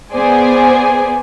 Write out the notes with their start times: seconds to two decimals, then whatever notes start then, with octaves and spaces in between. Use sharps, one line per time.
0.12 B3 G#4 C5 D5 G#5